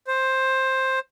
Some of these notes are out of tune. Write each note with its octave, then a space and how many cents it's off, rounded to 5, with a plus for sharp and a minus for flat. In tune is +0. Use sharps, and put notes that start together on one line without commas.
C5 +10